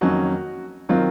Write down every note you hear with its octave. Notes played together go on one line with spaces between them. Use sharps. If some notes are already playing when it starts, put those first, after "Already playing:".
F2 D#3 F#3 A#3 C#4 F#4
D#3 F#3 C4 F4